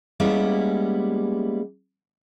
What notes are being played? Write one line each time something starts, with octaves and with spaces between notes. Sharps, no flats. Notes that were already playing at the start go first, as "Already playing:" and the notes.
G3 G#3 A#3 B3 C#4 E4